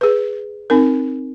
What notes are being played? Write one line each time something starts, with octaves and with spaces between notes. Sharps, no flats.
G#4 B4
C4 D#4 A#4